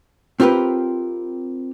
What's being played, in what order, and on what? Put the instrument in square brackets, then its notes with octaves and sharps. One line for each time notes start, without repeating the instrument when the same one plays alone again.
[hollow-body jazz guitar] C4 F4 G4 A#4 B4